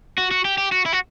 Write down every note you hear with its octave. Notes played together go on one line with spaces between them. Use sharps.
F#4
F#4
G4
G4
F#4
E4
F#4